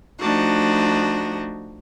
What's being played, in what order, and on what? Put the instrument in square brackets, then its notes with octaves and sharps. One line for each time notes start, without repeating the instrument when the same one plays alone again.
[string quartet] F3 A3 D4 D#4 F#4